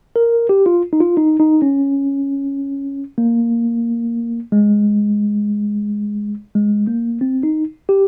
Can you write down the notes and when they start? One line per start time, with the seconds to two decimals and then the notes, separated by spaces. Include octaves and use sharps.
0.16 A#4
0.49 G4
0.66 F4
0.93 D#4
1.00 F4
1.17 D#4
1.40 D#4
1.62 C#4
3.18 A#3
4.52 G#3
6.55 G#3
6.87 A#3
7.21 C4
7.43 D#4
7.89 G4